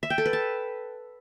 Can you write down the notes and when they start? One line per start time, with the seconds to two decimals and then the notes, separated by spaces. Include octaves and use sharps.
0.03 E5
0.10 G5
0.18 A4
0.25 B4
0.33 A5